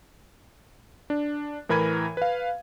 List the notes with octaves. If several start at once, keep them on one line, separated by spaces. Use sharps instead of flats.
D4
A2 E3 A#4 B5 G#6 D#7
B4 F5